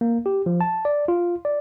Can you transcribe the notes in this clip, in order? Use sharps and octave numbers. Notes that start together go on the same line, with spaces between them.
A#3
G4
F3
A5
D5
F4
D5